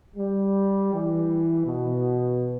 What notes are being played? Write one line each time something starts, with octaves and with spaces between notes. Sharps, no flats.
G3
E3
B2